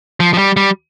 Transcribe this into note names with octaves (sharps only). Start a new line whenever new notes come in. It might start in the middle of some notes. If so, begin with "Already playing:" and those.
F3
F3
G3
G3